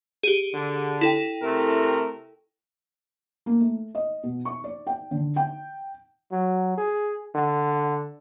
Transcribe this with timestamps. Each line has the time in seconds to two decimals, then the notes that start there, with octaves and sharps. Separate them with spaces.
0.23 G4 G#4
0.53 D3
1.01 E4 A4 G5
1.42 C3 A3 A#4
3.46 A#3
3.60 A3
3.95 D#5
4.23 B2
4.45 C#6
4.64 D5
4.87 G5
5.11 D3
5.36 G5
6.31 F#3
6.77 G#4
7.35 D3